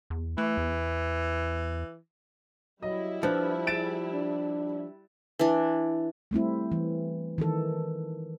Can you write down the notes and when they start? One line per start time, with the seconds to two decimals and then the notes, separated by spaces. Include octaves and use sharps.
0.10 E2
0.38 E3 A3
0.57 E2
2.83 F#3 G3 E4 D#5
3.23 F3 D4 B4 F#6
3.67 G#4 A6 D7 E7
4.13 D4
5.39 E3 D4
6.31 G3 A3 C4 E4
6.72 E3
7.38 D#3 E3 A4